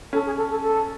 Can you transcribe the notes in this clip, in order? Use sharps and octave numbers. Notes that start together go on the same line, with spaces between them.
C#4 A4
G#4
A4
A4
A4